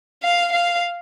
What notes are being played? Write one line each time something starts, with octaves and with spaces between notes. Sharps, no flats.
F5
F5